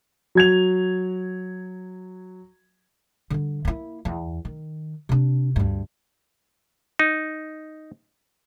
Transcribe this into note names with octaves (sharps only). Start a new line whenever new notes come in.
F#3 G#6 F7
D3 G3
A#3 E4
E2
D#3
C3 D4
D2 G2
D#4